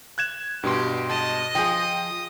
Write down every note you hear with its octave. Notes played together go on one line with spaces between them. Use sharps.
F#6 G#6 E7
G2 B2 G4 G5 C6
G#3 D#5 A5
F3 F4 G#4 G5 D#6 A#6